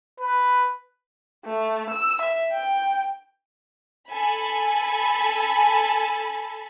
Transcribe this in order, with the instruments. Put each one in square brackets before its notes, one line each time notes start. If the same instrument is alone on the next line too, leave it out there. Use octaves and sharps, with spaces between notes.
[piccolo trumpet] B4
[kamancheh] A3
E6
E5
G5
[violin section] A4 G#5 B5